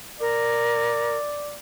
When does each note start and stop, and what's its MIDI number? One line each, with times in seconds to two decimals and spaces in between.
0.21 1.16 70
0.21 1.56 74